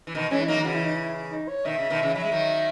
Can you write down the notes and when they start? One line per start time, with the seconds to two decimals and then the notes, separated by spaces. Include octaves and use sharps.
0.07 E3
0.15 B2 D#3
0.31 E3 G#3 C#4
0.42 E4
0.48 F#3 A#3 D#4
0.57 D#3
0.65 C#3 E3 F#4
0.74 E4
0.85 D#4
0.96 E4
1.31 D#4
1.48 C#5
1.65 B2 D#3 E5
1.78 C#3
1.90 B2 D#3
2.02 C#3 E3
2.15 F#3 E5
2.24 G#3
2.32 D#3 F#3